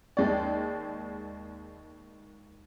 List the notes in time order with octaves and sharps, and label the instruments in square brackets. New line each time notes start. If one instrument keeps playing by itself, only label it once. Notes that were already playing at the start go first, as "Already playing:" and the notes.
[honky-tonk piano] D#2 G#3 D5